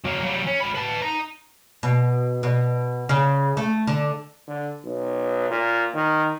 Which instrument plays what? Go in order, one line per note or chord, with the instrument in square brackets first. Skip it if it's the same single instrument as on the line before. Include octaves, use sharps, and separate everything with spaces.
[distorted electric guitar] F#3 A#3
F#3 G3
C#4
G#3 B5
B4 A5
D#5 A#5
[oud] B2
B2
C#3
A3
D3
[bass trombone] D3
B1
A#2
D#3